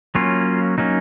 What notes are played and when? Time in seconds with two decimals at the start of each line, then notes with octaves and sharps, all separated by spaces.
0.15 F#3 A#3 C#4 F4
0.78 F#3 A#3 C#4 D#4